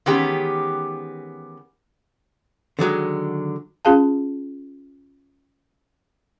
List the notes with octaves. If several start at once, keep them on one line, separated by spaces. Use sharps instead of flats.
D#3 E3 G#3 B3 C#4 G4
D3 D#3 F#3 G#3
C#4 F4 G#4 F5 A5